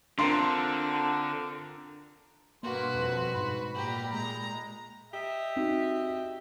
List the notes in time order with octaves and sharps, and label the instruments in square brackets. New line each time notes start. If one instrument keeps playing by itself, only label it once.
[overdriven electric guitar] D3 [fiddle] C4 [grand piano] D4 F4 A#4 [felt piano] C6
[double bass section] G2 B2 [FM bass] A#3 [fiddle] F#4 B4 [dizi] C6
[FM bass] F2
[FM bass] G#2 [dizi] B5
[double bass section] A#2 [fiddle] G4 A#5
[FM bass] G#3 [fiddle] A#5
[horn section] G4 D#5 E5
[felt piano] C4 D#4 F#4